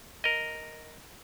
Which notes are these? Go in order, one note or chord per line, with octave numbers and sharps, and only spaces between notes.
A#4 D#5